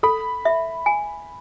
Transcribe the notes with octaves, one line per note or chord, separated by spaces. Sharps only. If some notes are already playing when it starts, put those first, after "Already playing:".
A4 B5
E5
G#5